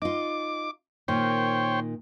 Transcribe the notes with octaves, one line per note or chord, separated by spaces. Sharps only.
D#4 F4 D6
A#2 D#3 C5 C#5 G5